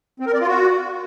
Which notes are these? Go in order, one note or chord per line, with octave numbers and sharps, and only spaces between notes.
C4
A#4
D5
F4
F#4